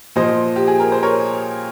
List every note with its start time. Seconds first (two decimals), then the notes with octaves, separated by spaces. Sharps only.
0.16 A#2 F3 C5 D#5
0.56 G4
0.68 G#4
0.80 A#4
0.92 C5
1.03 A#4 C#5